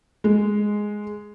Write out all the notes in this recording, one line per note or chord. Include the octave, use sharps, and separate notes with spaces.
G#3